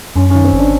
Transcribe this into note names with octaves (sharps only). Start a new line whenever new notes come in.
F#2 C#4
C#4
D#3
C4
G#1
D4